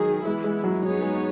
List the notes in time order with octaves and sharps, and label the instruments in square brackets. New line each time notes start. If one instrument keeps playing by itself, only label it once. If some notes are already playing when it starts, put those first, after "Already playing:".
Already playing: [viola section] D#3 G#4 [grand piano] F#3 G#3
[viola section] E3 B3 E4 [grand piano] G#3
[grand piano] G#3
F#3
[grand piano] F#3 [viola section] B3 D#4 G#4 C#5
[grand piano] G#3